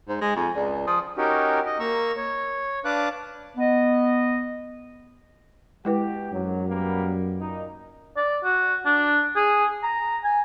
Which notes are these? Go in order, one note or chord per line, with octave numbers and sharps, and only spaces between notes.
G#2 C5
G#3 G#5
F2 G#5
C#2 D5
F3 D#6
C#4 D#4 F#4 G4 A#4
D#5
A#3 A#5 C#6 E6
C#5
D4 B4 F5 A5 D6 F#6
B3 D#5
B2 G#3 E4 G4 B4
G#1 F#2 F#3
G3 A#3 B3
A#2 D#4
D5
F#4
D4
G#4
A#5
G#5